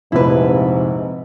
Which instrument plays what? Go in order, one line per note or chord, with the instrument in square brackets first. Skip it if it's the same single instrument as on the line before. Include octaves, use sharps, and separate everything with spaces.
[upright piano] F1 A#1 C3 [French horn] G#2 [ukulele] E4 B4